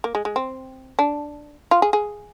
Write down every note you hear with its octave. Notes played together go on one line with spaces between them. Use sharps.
A#3
G#3
G#3
C4
D4
F4
G#4
G#4